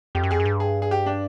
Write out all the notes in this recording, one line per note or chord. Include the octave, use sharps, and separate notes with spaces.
F2 G4
F#2
F2 G#4
F#2
G2
G#4
G#4
G4
D4